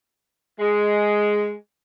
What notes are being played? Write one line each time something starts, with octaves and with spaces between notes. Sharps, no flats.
G#3